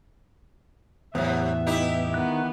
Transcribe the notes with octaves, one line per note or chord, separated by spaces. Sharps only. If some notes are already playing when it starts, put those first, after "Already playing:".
E2 A2 C3 F#3 G3 B3 E5
D#4 E4 G4
D#3 B3 F#6